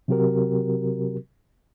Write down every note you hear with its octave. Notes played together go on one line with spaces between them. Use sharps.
C3 F#3 C4 F#4 G4 A#4